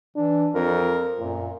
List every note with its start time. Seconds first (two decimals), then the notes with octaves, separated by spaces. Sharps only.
0.16 E3 D4
0.55 F2 A#4
1.20 F#2 A#2